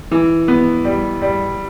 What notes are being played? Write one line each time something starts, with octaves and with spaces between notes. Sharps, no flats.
E3
B3
G3
G3